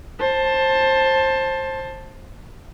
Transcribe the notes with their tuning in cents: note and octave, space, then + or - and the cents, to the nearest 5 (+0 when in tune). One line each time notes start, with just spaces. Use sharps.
C5 +20 A5 +0